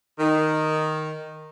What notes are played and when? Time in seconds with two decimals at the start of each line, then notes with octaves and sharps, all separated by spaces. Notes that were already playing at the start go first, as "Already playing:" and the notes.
0.19 D#3